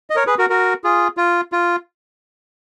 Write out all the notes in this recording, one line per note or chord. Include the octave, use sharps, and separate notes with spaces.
D#5
A#4 C#5
G#4 B4
F#4 A#4
F#4 A#4
F4 G#4
F4
F4